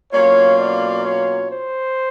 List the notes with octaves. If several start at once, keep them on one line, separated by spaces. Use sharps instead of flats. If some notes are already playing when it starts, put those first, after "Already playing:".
B2 F#3 A#3 C#4 F4 C#5
D5
C#5
C5